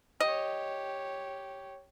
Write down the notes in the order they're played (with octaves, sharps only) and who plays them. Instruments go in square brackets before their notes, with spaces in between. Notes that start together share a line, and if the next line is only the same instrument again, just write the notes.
[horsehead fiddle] G4 C#5 [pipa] D#5